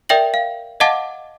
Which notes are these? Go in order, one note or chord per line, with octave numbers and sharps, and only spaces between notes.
A#4 D5 E5 G5 A#6 F#7
F5
D#5 F5 F#5 A5 D6 A6